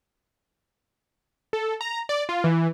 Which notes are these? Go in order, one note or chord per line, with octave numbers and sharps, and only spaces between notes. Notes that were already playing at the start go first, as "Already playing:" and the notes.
A4
A#5
D5
F4
E3